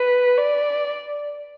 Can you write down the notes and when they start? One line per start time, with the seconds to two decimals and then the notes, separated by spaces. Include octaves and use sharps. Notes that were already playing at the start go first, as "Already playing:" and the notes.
Already playing: B4
0.37 D5